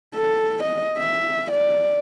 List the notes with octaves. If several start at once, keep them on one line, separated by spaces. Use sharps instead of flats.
A4
D#5
E5
D5